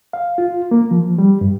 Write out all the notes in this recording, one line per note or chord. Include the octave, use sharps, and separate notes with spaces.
F5
F4
A#3
F3
G3
G2